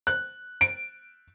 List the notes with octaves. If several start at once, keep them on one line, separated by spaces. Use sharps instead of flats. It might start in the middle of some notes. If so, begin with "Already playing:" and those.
F#6
D7